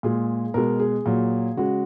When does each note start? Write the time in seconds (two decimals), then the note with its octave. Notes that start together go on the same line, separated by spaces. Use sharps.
0.03 A#2 G#3 G#4
0.54 B2 G#3 A#4
0.80 G#4
1.06 A#2 F#3
1.57 C#3 G#3 F#4